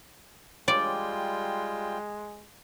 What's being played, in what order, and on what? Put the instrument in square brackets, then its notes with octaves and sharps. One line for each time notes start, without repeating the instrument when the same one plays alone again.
[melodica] G3 F4 G5 [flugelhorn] G#3 [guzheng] D5